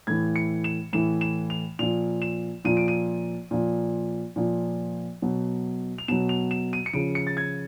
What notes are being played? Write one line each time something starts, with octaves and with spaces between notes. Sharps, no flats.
A2 E3 G#6
C#7
E7
A2 E3 E7
E7
F7
A#2 F3 F7
E7
A#2 F3 D#7
D7
D#7
A#2 F3
A#2 F3
B2 F#3
F7
B2 F#3 E7
F7
E7
D#7
C#7
C#3 F3 D7
C#7
A6
G#6